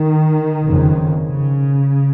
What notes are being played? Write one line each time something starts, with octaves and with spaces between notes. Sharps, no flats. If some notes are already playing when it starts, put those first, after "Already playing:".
Already playing: D#3
F#1 F2 C#3
C#3